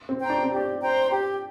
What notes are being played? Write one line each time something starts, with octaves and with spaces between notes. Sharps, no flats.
C4
C5 G5 A#5
D4
C4
G4
D4
C5 G5 A#5
G4